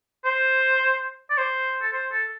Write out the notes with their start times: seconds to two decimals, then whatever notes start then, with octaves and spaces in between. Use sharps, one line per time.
0.25 C5
1.30 D5
1.37 C5
1.82 A4
1.93 C5
2.12 A4